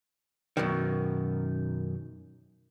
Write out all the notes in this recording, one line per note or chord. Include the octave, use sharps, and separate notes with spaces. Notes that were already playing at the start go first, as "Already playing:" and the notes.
F#2 B2 D#3